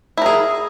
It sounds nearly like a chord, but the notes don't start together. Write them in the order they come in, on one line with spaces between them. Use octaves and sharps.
E4 A#4 G#4